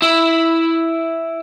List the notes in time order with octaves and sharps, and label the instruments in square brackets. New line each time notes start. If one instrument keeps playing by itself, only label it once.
[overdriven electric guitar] E4